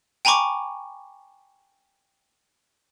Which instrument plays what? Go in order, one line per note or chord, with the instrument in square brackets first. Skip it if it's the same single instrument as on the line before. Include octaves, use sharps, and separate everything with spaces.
[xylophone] G5 G#5 A#5 B5 C#6 D6